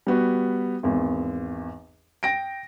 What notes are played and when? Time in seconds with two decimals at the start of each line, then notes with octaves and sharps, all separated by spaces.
0.07 G3 B3 F#4
0.83 G#1 E2
2.23 G5 A#6 D7